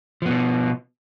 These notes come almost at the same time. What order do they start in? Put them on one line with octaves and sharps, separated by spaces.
F3 B3 B2